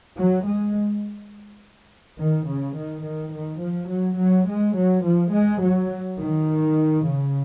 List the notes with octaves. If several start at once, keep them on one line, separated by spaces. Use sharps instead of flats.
F#3
G#3
D#3
C#3
D#3
D#3
D#3
F3
F#3
F#3
G#3
F#3
F3
G#3
F#3
D#3
C#3